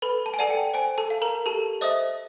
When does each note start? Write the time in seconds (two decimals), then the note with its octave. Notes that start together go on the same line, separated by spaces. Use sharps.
0.02 A4 B4 B5
0.26 A5
0.34 G#5
0.39 A4 D5 F#5 A5
0.50 G5
0.74 C5 G#5
0.98 A4 A5
1.10 F5
1.22 A#4 A#5
1.46 G4 A4 A5
1.81 C5 D#5 E5 D#6